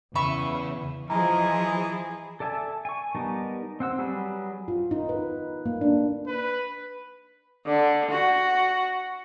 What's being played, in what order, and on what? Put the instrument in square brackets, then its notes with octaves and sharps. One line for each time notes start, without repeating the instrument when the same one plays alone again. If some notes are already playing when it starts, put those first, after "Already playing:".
[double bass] E2 [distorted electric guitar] C#3 [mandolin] B4 E5 C#6 [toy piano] B5
[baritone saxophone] E3 [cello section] F3 G#4 [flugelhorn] D#5 [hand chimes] A#5
[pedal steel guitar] A4 D5 E5 G#5 A5
G#5 C#6
G3 B3 D#4 A#4 A5
C4 F#5 E6
F#3 G3 G#4 B4
[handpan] F4
D#4
B4
A#3
D4
[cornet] B4
[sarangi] D3
F#4